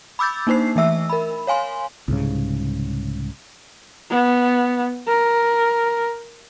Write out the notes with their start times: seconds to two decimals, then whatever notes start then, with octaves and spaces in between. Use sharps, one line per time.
0.19 B5 D6 E6 G6 A6
0.47 A#3 D4 D#4 C5 C7
0.76 E3 A3 E5 E6
1.09 A#4 B5
1.47 C#5 F5 G#5 C6
2.08 C2 G#2 C#3
4.11 B3
5.08 A#4